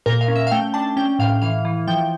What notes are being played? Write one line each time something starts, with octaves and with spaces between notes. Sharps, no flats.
A#2 A#4
F5
C#4
E5
F5
A3 G5
D4 A5
C#4 G5
A2 F5
E3 F5
E3
F3 G5